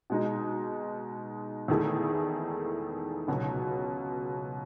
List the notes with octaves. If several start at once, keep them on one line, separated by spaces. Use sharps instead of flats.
B2 G#3 D#4
E2 D#3 A3 E4 G#4
C#2 B2 F#3